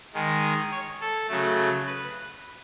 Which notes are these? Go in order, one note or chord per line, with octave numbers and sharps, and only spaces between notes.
D#3 G#3
C#5
A4
C#3 F#3 A3
B4